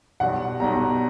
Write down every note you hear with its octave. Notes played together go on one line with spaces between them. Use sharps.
B1 B2 G3 F#5
B1 B2 G3 A#5